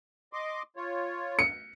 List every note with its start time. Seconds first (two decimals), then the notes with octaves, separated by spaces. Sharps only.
0.33 D#5 C6 D6
0.76 F4 C#5
1.39 C#7